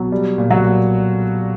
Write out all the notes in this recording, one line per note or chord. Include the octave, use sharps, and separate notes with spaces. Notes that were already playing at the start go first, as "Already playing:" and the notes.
Already playing: B2 F#3
G3
A#2
F#3 F#4
A#2